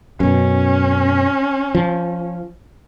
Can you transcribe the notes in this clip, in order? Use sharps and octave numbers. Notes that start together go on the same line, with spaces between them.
F#2 B2 C#4
F3